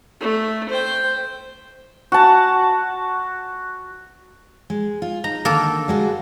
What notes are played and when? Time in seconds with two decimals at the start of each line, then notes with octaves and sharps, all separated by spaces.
0.20 A3
0.69 C5 G5
2.12 F#4 A5
4.70 G#3
5.02 F4
5.24 D#4 A#5
5.45 D3 D#3 A#3 A4
5.88 G3 G#3 F#4